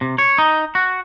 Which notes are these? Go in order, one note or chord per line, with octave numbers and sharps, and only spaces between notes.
C3
C#5
D#4
F#4